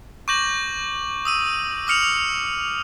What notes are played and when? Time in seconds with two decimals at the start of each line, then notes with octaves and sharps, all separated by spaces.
0.28 C#6 D6 G6 A#6 F#7
1.25 D#6 E6 D#7
1.87 D6 D#6 F6 C#7 F7 F#7